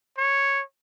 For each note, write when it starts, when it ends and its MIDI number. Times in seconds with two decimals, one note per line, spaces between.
0.18 0.62 73